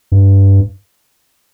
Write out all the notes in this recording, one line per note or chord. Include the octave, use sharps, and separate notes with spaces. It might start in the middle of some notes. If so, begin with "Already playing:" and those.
G2